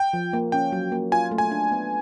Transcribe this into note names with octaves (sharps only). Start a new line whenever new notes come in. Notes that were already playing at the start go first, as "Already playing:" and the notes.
Already playing: G5
F3
A#3
C#4 G5
F#3
A#3
F4 G#5
A3
G#5
D4
B3